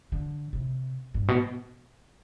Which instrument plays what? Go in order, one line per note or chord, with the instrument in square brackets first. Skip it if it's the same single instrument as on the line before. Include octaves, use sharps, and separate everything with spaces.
[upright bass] D3
C3
G2
B2